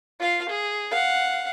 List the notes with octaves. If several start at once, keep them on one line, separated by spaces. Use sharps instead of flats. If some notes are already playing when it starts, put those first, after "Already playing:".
F4 F5
G#4
F5 F#5